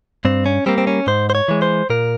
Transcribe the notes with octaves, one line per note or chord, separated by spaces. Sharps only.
G2 C4
C#4
G3 A#3 C4
C4
C#4
G#2 C5
C5
C#5
E3 G#3
C5
A#2 A#4